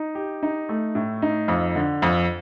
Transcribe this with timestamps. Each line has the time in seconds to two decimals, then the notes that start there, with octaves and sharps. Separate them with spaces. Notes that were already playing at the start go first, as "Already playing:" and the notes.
Already playing: D#4
0.15 G4
0.43 D#4
0.69 A3
0.95 A2
1.22 D#4
1.48 F2
1.76 D3
2.02 F2